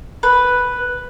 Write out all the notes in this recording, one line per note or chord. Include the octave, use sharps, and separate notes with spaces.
B4